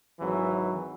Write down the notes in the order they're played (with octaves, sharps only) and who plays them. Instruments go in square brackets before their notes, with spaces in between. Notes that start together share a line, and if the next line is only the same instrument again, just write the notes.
[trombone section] G#1 E3 F#3